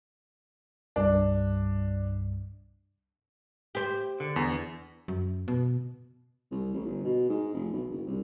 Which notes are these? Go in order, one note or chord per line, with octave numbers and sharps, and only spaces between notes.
C2 G2 D4
G4 C5
D3
E2
F#2
B2
C2
A1
G1
B2
G#2
F1
B1
F#1
C2